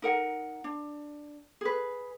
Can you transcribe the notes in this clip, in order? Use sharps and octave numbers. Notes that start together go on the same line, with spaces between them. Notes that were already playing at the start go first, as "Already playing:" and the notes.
D#4 A#4 F#5
D4
G#4 B4